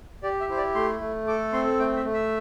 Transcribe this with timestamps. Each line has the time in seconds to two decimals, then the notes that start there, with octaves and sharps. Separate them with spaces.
0.23 G4 D5
0.41 E5
0.49 E4 C5
0.57 D5
0.75 A3 C6
1.01 A3
1.27 A4 D6
1.53 C4 C6
1.79 A3 G5
1.96 E5
2.05 A3
2.14 E5